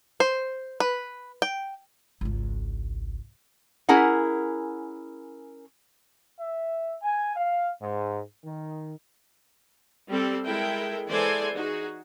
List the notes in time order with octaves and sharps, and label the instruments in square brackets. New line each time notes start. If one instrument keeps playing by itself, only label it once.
[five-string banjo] C5
B4
G5
[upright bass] G#1 C#2
[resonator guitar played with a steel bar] C#4 E4 G#4 A#4 F#5
[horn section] E5
G#5
F5
G#2
D#3
[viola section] G3 C4 A4
G#3 E4 A4 A#4 G5
E3 G#3 A4 C5 D5 G#5
D#4 F#4 G#4